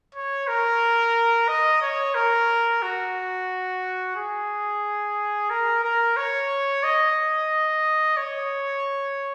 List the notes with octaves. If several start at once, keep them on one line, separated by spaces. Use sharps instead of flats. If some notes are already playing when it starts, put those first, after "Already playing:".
C#5
A#4
D#5
C#5
A#4
F#4
G#4
A#4
A#4
C#5
D#5
C#5